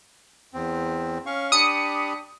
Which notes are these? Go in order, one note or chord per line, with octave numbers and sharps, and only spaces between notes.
E2 C4
C#4 F5 C#6
D4 G4 B5 D#6 C#7